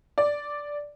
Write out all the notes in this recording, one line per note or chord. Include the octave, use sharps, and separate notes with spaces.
D5